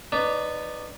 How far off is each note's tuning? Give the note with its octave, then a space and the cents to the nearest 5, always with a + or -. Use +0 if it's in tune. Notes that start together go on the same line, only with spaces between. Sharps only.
D#4 -30 B4 +10 D5 -20